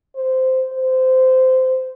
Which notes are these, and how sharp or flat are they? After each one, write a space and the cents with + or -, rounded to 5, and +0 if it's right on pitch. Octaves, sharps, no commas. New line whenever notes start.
C5 -10
C5 -15